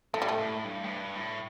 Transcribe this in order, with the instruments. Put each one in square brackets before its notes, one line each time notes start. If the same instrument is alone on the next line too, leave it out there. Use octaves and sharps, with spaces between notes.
[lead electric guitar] A2 [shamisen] A3
[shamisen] G3
A3
[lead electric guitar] A2
G2
A2
G2
A2